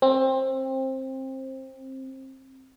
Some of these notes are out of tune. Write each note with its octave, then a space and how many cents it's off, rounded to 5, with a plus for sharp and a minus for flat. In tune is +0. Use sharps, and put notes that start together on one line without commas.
C4 +20